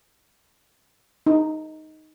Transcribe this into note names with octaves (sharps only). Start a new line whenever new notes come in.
D#4